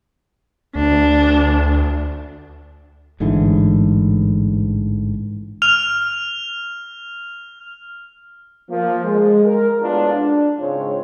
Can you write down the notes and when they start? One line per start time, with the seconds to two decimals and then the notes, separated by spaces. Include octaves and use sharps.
0.75 D2 D4
3.20 A1 G#2 D3 E3
5.62 F6 F7
8.70 F3 A#3
9.05 G#3
9.45 A#4
9.82 A2 G#3 B3 D4 F4
10.13 D4
10.59 G#2 C#3 G#3 C4 F4 C#5